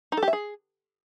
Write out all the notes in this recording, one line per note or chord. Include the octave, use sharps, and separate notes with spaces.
D#4
A4
G4
E5
G#4